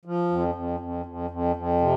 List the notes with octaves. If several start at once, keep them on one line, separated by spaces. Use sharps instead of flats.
F3
F2
F2
F2
F2
F2
F2
C3